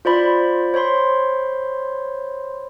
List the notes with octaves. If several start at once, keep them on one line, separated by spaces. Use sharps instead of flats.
F4 C5 D5 B5
C5 C#5 B5 C6